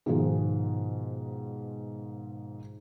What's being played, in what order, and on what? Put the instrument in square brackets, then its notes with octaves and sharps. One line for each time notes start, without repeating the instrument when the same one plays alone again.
[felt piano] G#2 B2 D#3 F3 G#3